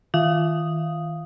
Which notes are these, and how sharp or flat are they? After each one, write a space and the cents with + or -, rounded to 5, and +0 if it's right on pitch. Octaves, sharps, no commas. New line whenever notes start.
D#3 +35 F5 +0 D#6 +0